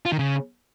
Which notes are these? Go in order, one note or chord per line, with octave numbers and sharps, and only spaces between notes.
F4
D#3
C#3